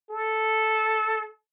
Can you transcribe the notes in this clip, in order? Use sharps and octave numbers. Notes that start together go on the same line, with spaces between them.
A4